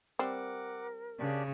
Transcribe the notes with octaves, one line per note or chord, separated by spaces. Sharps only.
G3 C4 A#4 F#5 D6
C#3 D4 G4 D5